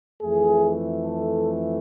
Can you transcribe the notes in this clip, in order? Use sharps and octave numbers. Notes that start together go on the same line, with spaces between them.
F2 E3 A3 G#4
A4